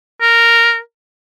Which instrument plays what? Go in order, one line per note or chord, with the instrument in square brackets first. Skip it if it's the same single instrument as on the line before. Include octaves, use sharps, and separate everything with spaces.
[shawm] A#4